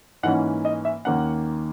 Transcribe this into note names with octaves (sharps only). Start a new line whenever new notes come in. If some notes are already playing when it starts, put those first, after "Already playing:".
G#2 E3 A#3 C#4 F#5
D#5
E5
D#2 D#3 A#3 C#4 F#5